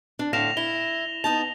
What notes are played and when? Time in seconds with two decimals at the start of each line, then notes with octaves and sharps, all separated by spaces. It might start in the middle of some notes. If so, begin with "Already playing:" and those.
0.19 D4
0.33 A2 D3 F5 A#6 E7 F7
0.57 E4 G7
1.24 B3 D#4 A5 F7